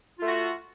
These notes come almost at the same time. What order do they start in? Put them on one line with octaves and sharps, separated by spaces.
F4 A3 F#4